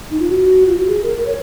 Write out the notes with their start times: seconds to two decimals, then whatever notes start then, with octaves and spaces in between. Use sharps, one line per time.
0.11 D#4
0.20 F4
0.28 F#4
0.66 F4
0.77 F#4
0.88 G#4
1.03 A#4
1.17 A#4
1.26 C#5